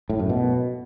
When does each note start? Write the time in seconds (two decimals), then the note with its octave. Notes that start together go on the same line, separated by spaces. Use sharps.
0.10 A2
0.19 F#2
0.29 B2